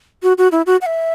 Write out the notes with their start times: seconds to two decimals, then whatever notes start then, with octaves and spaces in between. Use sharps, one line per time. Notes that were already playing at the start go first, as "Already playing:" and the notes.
0.23 F#4
0.38 F#4
0.52 E4
0.66 F#4
0.81 F#5
0.86 E5